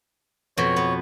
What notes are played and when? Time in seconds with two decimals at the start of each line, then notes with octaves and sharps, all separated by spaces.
0.57 F2 B2 C#5
0.76 B3